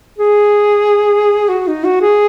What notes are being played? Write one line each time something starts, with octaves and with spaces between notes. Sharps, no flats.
G#4
F#4
D#4
F#4
G#4